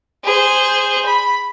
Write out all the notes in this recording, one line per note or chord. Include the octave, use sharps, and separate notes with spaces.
G#4 C5
B5